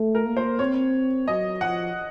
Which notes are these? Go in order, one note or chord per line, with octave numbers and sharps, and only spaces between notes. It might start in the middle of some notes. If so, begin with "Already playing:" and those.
Already playing: A3
A#4
A#3
C5
C4 C#5
F#3 D#5
F3 F#5